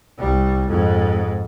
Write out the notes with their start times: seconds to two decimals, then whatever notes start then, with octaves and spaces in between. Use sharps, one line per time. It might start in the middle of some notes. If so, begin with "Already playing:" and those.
0.18 C2 G3
0.68 F2 G#2